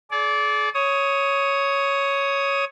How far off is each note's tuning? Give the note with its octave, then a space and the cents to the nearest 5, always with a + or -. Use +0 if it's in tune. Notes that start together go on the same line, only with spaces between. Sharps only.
G#4 +40 D5 -20
C#5 +0 D#6 +15